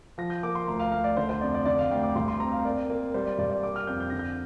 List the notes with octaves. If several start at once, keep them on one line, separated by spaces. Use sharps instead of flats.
F3 A#6
G6
A#3 D6
C6
D2 A#5
F5
D2 F5
D5
D3 C5
C5
F2 D5
D5
D3 D5
F5
D2 G5
D6
G2 C6
C6
C4 A#5
F5
A#3 D5
A#3
G3 C5
D5
G2 D5
D5
A#3 D6
F6
F2 G6
G6
D3 A#6
G6